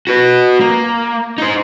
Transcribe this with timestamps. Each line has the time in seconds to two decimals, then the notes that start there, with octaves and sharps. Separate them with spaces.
0.07 F#4 B4
0.60 A#3
1.38 D#4 C5